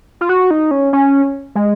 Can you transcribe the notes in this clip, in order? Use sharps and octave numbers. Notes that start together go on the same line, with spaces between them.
F4
F#4
D#4
C#4
C#4
G#3